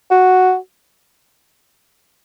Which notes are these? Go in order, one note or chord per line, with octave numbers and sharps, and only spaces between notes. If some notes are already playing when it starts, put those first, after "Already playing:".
F#4